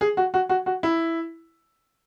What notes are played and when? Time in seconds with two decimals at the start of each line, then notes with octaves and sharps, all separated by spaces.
0.01 G#4
0.17 F#4
0.34 F#4
0.49 F#4
0.66 F#4
0.83 E4